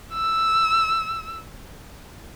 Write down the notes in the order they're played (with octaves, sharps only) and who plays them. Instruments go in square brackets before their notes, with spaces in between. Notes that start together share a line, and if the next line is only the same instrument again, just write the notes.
[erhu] E6